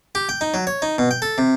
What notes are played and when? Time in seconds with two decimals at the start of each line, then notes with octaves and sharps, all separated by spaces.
0.15 G4
0.29 G5
0.41 D#4
0.54 F#3
0.67 C#5
0.82 D#4
0.98 B2
1.11 G5
1.22 A4
1.38 C3